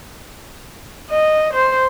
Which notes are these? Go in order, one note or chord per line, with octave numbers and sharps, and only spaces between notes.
D#5
C5